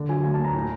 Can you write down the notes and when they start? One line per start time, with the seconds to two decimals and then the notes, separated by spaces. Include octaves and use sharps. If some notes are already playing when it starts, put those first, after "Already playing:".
Already playing: D3
0.09 F#3 G#5
0.24 D2 G#5
0.34 A5
0.39 D2
0.44 A#5
0.54 A2